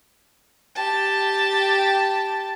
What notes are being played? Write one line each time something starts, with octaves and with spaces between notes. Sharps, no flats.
G4 A5